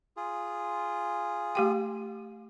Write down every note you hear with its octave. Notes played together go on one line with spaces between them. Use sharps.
F4 G#4
A3 G4 G5